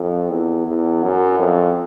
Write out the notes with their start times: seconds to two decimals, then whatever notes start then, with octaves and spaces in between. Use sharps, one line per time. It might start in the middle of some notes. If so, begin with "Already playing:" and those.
Already playing: F2
0.30 E2
0.67 E2
1.03 F#2
1.39 F2